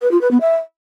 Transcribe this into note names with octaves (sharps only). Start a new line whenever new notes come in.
B4
F4
B4
B3
E5